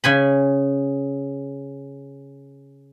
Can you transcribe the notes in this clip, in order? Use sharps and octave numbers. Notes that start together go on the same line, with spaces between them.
C#3 G#5 B5